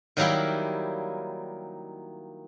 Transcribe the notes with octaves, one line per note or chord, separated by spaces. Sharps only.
D#3 F#3 G3 A#3 E4 G4